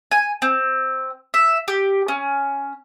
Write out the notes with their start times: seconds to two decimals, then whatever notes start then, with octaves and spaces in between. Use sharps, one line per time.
0.11 G#5
0.42 C4
1.34 E5
1.68 G4
2.08 C#4